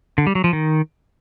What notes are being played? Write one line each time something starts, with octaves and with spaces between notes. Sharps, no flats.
D3
G3
F#3
F3
D#3